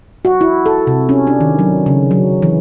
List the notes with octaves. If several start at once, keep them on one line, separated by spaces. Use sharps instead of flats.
F#4
E4
A4
C3
C#4
D4
D#3
F#3
C#3
F#3
E3